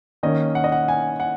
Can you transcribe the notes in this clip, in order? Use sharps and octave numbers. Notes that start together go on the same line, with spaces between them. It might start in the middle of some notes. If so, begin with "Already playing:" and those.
D#3 A#3 C#4 D#5
F#5
D#5
F#5
G#5
F#5